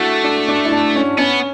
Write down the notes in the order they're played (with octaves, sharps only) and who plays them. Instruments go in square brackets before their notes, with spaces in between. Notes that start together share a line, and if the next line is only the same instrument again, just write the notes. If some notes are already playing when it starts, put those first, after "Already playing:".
Already playing: [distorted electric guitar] A3 [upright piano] D4 E4 F#4
[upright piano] D4
D4
E4
D4
C#4
[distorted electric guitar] B3 [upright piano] C#4